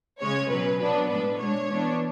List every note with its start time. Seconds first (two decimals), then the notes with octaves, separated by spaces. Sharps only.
0.21 C#3 G#3 C#4 C#5
0.51 B2 F#3 C#4 B4
0.81 B2 F#3 B3 D4 B4
1.10 A2 G#3 D4 B4
1.40 B2 G#3 D4 C#5
1.69 E3 B3 D4